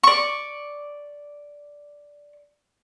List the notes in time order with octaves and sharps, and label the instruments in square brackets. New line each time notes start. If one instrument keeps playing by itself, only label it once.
[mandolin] D5 C#6